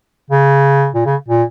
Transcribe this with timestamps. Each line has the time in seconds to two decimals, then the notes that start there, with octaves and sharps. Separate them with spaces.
0.30 C#3
0.94 A#2
1.06 C#3
1.28 A#2